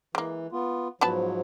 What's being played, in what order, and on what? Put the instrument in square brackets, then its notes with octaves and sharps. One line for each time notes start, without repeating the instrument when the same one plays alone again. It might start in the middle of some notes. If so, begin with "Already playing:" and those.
[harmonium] E3 [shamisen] G#3 A#3
[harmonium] B3 F4
[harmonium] G#2 F3 F#3 [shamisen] B3 B4 A5